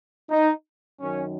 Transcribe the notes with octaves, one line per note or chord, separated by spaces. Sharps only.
D#4
F#2 D#3 F#3 C#4